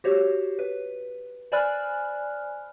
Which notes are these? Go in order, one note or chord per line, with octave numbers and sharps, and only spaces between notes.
F#4 G4 C5 C#5
B4
C5 D5 G#5 B5 F6 F#6